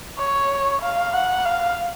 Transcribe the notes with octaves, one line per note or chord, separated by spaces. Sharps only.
C#5
F5
F#5
F5